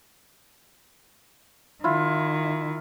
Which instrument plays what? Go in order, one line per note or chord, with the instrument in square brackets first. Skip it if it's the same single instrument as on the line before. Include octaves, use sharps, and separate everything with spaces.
[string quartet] D#3 [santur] E4 F4